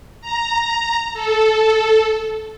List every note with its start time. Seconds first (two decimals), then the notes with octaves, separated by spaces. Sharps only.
0.22 A#5
1.14 A4